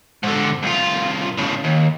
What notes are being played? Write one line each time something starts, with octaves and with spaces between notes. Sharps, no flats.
G#2 D3
C2 F4
A2 C#3
D#2